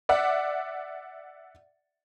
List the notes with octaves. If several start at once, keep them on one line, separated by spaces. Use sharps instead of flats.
D5 E5 F#5